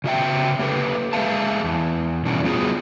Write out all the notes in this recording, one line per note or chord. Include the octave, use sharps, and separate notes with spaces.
C#3 F#4 E5 G5
A#3 G4 A4 B4
G#3 G#4 E5 F5 A5
E2
B2 G3 C#4 D4 F4
G3 B3 F4 F#4 G#4